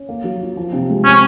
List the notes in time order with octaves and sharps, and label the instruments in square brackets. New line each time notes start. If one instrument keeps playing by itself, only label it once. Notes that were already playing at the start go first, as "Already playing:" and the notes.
Already playing: [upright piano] C#4
A#3
F#3
F4
F3
C3
G#3
[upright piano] C4 [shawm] C#4